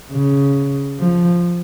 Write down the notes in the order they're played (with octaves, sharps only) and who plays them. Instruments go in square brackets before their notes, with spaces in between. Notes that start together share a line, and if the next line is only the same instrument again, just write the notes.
[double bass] C#3
F3